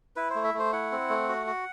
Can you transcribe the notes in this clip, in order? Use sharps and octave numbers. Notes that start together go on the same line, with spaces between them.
E4 B4
A3 C5
E5
A3 C5
E4 F#5
C4
A3
F#4
F#4